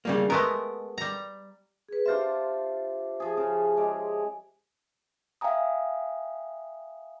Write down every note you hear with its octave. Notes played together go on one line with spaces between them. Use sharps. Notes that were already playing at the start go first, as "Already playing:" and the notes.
C#3 G3 A#3
G#3 A3 B3 A#4
G3 A#5
G#4 B4
D4 F4 G4 C5 E5 C6
F3 G#4
C#3
G#3 D5
E5 F5 G5 G#5 A#5 D#6